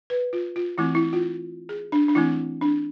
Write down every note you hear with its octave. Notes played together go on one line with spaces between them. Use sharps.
B4
F4
F4
E3 A3 C4 E4
E4
F4
G#4
D4
D4
E3 A3 C4 E4
D4